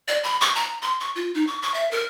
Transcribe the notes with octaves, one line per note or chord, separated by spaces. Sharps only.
D5
B5
C#6
A#5
C6
C#6
F4
D#4
C#6
C#6
E5
A#4